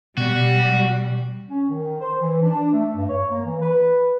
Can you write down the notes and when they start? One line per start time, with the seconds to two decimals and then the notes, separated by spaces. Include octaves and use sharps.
0.18 B2 G3 F#4
1.48 C#4
1.69 D#3
2.01 C5
2.21 E3
2.42 D4
2.73 A3
2.96 G2
3.09 C#5
3.31 A#3
3.44 E3
3.61 B4